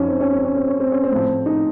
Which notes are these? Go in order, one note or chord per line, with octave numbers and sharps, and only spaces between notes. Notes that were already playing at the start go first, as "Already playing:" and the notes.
Already playing: F#2 F3 C#4 D#4
C4
C#4
C4
C#4
C4
C#4
C4
C#4
C4
A2 F3
D#4